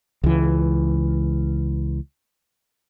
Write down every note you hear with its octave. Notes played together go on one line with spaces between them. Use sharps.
C#2 E3